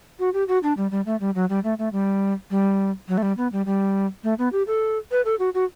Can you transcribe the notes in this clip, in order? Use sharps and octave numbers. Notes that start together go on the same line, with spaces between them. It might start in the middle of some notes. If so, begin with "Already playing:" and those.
F#4
G4
F#4
D4
G3
G3
A3
G3
F#3
G3
A3
A3
G3
G3
F#3
A3
G3
B3
G3
G3
A3
B3
G4
A4
B4
A4
F#4
F#4